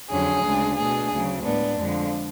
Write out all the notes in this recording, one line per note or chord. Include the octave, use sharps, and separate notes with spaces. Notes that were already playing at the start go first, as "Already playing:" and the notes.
F2 D3 F#3 C#4 G#4
D2 C#3 G#3 D4
B2 A3 D4 G#4
D2 C#3 F#3
A2 G#3 B3 D4
F2 D3 F3 G#3